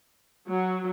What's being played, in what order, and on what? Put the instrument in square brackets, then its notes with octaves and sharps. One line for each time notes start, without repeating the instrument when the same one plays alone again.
[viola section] F#3